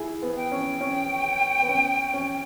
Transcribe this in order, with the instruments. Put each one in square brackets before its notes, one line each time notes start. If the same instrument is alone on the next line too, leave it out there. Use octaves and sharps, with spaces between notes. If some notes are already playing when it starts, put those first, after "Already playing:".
Already playing: [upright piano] E4 G#4
B3
[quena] G5
[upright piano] C#4
C#4
B3
C#4
C#4